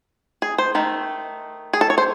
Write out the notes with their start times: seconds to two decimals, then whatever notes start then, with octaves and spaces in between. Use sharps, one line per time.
0.42 G#4
0.58 C5
0.75 D#3 A3
1.73 G#4
1.81 A4
1.90 C#5
1.98 C5